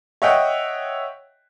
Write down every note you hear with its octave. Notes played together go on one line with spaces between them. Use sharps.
C#5 D#5 E5 F#5 G5